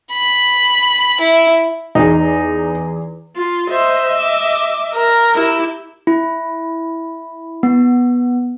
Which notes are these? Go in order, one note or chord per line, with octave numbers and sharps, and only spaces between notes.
B5
E4
E2 D#4 G#4
F4
C5 D#5 E5
D6
A#4
E4 G4
E4
B3